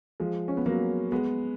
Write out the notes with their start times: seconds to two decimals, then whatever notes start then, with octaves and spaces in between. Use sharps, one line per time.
0.20 F3 G#3
0.48 C#4
0.57 B3
0.66 F#3 A#3
1.12 G#3 B3